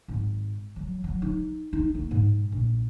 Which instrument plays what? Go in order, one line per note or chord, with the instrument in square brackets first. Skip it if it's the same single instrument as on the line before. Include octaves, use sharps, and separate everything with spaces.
[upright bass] G#1
F#3
F#3
D#4
D#4
A#3
G#2
A#1